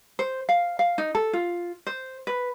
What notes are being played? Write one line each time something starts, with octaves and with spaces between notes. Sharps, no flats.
C5
F5
F5
D#4
A4
F4
C5
B4